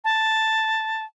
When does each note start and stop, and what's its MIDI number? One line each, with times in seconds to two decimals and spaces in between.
0.04 1.04 81